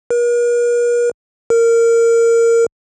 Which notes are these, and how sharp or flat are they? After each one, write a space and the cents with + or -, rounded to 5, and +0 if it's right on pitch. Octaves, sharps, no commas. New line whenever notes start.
A#4 +45
A#4 -15